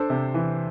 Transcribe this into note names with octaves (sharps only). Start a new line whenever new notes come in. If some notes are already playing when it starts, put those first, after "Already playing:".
Already playing: D4 A4 C5
C3
E3